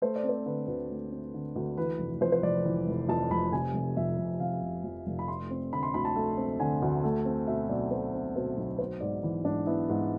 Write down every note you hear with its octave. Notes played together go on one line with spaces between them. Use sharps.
A3 C5
D5
C4
C5
D3 B4
D2 B4
A3
C4
D3
D2
E3 B4
F1
F2 C5
C5
F1 D5
E3
F1
F2 A5
F1 B5
C3 G#5
F1
F2 E5
F1
C3 F5
F1
F2
F1
B5
A3 C6
C4
D3 B5
C6
D2 B5
A5
A3
C4
D3 G#5
D2
A3
C4
B2 E5
B1 D5
A3 C5
C4
B2 C5
B1
B3 C5
G#2 D5
E3
G#2 D4
B3 E4
G#2